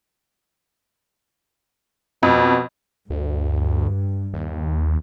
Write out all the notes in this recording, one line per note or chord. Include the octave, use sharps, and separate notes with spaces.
F2 B2
D2 G2
D#2